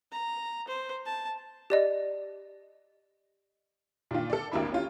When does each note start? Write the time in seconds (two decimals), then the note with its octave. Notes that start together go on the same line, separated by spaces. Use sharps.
0.12 A#5
0.68 C5
1.06 A5
1.70 G4 D5 D#5
4.11 A#2 D3 D#3 F4
4.30 A4 D5
4.51 G#1 D2 A#3 D4 E4 B5
4.72 C#4 F4 G4